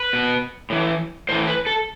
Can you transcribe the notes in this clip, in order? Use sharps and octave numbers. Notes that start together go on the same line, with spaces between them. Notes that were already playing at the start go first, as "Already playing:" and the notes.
Already playing: B4
B2
A2 E3
A2 E3 C5
B4
A4